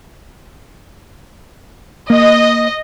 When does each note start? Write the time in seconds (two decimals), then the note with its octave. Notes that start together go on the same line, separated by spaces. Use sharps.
2.10 A#3 D#5